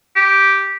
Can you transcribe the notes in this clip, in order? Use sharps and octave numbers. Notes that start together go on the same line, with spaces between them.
G4